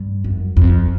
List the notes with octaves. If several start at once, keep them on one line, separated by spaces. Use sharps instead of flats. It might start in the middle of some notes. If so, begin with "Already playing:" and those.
Already playing: G2
F#2
F2